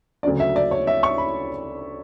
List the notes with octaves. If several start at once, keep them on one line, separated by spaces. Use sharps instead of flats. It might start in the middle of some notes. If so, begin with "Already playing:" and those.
D2 C#3 F#3 C#4 D5
E5
D5
C#5
E5
C#6
B5